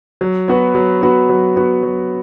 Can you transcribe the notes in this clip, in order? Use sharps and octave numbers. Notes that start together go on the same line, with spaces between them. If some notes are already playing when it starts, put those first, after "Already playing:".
F#3
B3 F#4 B4
F#3
B3 F#4 B4
F#3
B3 F#4 B4
F#3